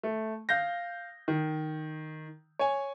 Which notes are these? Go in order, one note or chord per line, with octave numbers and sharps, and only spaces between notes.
A3
F5 G6 A#6
D#3
C#5 G#5